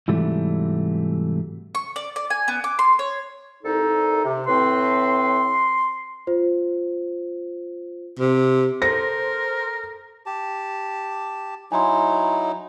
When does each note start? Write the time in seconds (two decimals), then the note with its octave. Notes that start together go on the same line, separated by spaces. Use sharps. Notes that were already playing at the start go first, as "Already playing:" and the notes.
0.08 G#2 C3 E3 F#3 G3 A3
1.75 C#6
1.96 D5
2.16 D5
2.30 G#5
2.48 B3
2.64 D6
2.79 C6
2.99 C#5
3.63 C2 D#4 A4
4.24 C3
4.47 A2 C4 B4 C6
6.27 F4 C5
8.19 C3
8.82 A4 A#4 C5 A#6
10.26 G4 A5
11.72 F#3 D#4 E4 G#5 A#5 C6